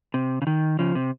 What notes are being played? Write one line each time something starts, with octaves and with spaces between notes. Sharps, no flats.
C3
C#3
D#3
C#3 F3
C3